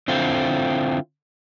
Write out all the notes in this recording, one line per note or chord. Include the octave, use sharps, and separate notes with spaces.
D3 C4 E4 F4